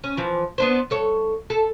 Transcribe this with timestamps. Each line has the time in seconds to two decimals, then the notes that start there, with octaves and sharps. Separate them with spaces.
0.04 C#4
0.17 E3 F3
0.58 B3 D4 C5
0.90 G2 A4 C#5
1.50 A4